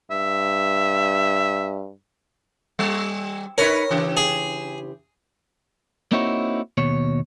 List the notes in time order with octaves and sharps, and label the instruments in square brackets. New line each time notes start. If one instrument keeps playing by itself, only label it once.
[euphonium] G2 [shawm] E5
[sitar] G3
[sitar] D#4 B4 C#5 [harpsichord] A#4
[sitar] C#3 E3 G4
[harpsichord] G#4
[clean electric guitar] A#3 C4 D#4 E4 F#4 C#5
D#2 B2 C#5